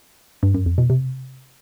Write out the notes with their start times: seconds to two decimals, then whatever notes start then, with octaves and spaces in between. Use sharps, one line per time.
0.43 G2
0.54 F#2
0.66 F2
0.78 B2
0.90 C3